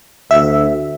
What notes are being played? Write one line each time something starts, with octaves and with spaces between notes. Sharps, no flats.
D2 E5